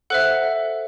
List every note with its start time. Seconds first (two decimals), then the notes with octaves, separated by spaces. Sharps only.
0.10 A4 C5 E5 F#5 F#6